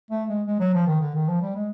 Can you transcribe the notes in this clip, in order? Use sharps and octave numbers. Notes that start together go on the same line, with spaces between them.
A3
G#3
G#3
F#3
F3
D#3
D3
D#3
F3
G3
G#3